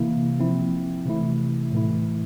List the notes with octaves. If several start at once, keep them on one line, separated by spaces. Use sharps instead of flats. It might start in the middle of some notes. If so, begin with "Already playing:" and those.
Already playing: C3 E3 A#3 E4
F3 C4 E4
C3 E3 A3 E4
A2 E3 A3 E4